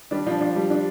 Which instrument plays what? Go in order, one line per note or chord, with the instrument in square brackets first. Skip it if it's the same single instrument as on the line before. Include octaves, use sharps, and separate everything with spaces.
[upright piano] G3 [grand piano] D4
[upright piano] F3 [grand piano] D4
[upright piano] F3 [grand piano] D4
[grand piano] G3
D4